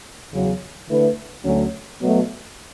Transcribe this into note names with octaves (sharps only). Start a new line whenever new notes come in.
E2 C#3 F#3
D3 A3 E4 B4
D2 D3 F#3 A3 C#4
B2 F#3 A3